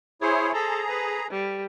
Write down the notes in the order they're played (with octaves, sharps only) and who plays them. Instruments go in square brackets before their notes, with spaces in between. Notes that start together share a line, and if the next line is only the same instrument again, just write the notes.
[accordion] E4 G#4 C#5 [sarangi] C5
[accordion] G#4 A#5 [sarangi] A4
[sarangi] B4
G3